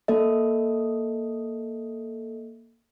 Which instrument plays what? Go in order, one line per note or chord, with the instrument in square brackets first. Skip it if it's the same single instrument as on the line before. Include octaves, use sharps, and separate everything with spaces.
[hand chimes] A#3 A4 D#5